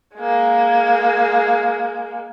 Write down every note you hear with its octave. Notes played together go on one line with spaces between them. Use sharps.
G#3 A#3